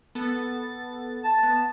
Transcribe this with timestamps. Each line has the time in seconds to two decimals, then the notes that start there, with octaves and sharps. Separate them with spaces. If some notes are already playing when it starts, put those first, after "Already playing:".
0.15 B3 A4 A6
1.23 A5
1.43 B3